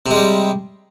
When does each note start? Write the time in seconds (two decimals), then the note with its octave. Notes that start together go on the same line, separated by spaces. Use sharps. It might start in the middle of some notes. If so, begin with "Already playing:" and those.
0.06 C3
0.11 G#3
0.16 G3